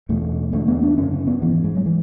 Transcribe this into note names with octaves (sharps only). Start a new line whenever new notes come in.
E2 B2 A3
E2 D3 A3
B3
D4
F#2 C#3 C#4
C#4
B3
G#2 E3
E3
G#3
F#3
E3